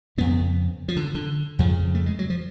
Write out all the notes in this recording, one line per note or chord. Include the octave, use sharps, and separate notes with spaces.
F2 C#3 B3
F3
D3
D3
F2 C#3 F3
A3
G#3
F#3
F3